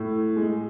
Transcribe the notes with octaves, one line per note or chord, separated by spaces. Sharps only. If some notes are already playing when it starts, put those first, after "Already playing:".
Already playing: A2
G#3